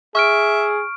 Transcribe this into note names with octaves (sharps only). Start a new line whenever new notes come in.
G#4 E5 C#6 F6 D7